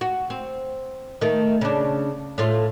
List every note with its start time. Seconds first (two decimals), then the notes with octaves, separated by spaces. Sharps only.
0.01 F#4
0.30 C4
1.21 D#3 A3
1.61 C#3 D4
2.38 A2 A3 F4